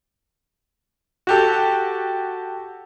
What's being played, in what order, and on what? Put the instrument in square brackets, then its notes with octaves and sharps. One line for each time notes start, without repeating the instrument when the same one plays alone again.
[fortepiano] F#4 G4 A4